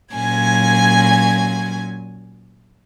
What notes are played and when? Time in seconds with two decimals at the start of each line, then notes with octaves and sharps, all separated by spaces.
0.14 A#2 F#3 C#4 G#5 G#6